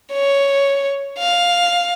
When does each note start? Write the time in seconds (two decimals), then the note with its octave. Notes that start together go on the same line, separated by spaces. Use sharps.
0.13 C#5
1.18 F5